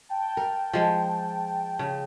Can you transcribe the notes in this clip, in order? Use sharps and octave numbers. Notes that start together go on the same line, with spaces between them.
G5 A5
A#4
F3 G#3
C#3